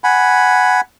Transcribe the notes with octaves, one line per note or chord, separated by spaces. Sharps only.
F#5 G#5 B5